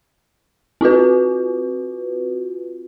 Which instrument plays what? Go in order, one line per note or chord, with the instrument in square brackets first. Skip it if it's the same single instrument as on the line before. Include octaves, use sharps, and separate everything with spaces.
[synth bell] C4 F4 F#4 B4